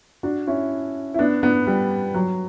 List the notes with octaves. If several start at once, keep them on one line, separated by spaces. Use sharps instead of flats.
D4 F#4
C#4 E4
E4
B3 D4
B3 D4
G3
F#3